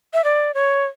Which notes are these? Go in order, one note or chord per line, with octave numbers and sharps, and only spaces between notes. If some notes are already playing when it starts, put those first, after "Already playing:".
E5
D5
C#5